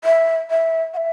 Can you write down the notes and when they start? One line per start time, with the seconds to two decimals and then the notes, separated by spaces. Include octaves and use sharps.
0.04 E5
0.50 E5
0.94 F#5
0.97 E5